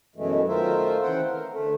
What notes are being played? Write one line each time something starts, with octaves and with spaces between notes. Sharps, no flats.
F#2 B2 E3 G#3 A3
D#3 A3 F4 A#4 C5 E5
C#3 E3 C4 C5 F#5 G5
A#4
D2 A3